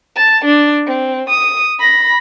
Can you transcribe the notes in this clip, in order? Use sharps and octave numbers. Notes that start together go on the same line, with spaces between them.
A5
D4
C4
D#6
B5 A#6